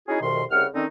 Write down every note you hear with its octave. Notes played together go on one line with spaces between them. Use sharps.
C#4 D#4 E4 F#4 G#4
C2 F2 B2 D#3 C6
C2 C#3 F#5 F6
D3 D#3 C4 C#4 D#4